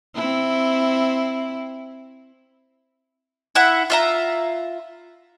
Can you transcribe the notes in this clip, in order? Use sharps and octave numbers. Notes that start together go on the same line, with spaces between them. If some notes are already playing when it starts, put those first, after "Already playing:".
C4 E4
E4 E5 F#5
F4 E5 A#5